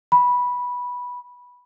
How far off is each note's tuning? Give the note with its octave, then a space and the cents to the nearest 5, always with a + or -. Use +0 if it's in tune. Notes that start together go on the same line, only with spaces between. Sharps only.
B5 -10